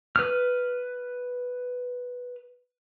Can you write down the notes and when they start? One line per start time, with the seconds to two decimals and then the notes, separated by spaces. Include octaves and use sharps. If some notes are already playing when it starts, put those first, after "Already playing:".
0.16 B4 F6